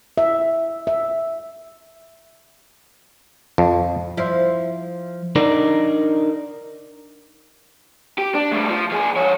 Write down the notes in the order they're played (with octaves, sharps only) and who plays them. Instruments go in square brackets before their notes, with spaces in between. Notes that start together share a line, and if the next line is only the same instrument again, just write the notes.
[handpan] E5
E5
[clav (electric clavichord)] F2
[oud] F3 E4
[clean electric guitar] D4 D#4 A#4 D5
[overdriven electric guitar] G4
D4
A2 G3
F3
F3 G#4
F3 C#5